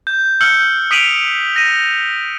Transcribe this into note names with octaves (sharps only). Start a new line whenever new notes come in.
G6
E6 F6 G6 C#7 F#7
D#6 B6 D7 D#7 F7 F#7
A#6 D#7